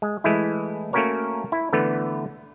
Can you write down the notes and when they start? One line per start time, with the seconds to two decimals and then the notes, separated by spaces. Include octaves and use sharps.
0.02 G#3
0.24 E3 G#3 A3 E4
0.93 A3 A#3 C#4 F#4 A#4 C#5
1.52 E4
1.73 D3 E3 A3 B3